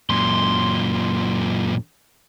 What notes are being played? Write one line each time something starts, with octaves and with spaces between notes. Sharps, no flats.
F#2 A#2 C6